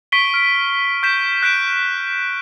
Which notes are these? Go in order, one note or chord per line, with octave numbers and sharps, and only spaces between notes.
C#6 B6 C7 D7 G7
F6 D7
C#6 G6 B6 E7
F#6 B6 D7 E7